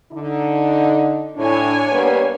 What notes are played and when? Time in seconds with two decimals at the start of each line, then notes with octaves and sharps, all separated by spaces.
0.12 D3 D#4
1.37 A2 D4 C#5 G#5
1.91 G3 A#3 B3